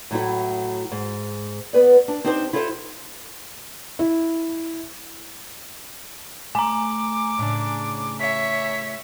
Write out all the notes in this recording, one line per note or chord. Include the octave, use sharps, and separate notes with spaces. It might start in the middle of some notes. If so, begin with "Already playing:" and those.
A2 F#3 A3 E4
G#2
B3 B4 D5
D4
C4 D4 D#4 G4 A4 C5
E4 F4 G4 A4 B4 C5
E4
A3 G#5 A#5 D6
A2 C#3 D4
C#5 E5 B6